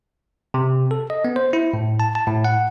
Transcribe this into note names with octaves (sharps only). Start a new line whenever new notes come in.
C3
A4
D#5
B3
C5
E4
A2
A5
A5
A2
F#5